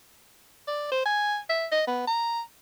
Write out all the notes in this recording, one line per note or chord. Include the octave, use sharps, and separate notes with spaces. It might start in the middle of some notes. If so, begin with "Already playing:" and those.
D5
C5
G#5
E5
D#5
B3
A#5